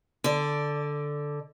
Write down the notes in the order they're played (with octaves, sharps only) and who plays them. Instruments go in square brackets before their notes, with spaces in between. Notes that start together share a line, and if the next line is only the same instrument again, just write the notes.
[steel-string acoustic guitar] D3 D5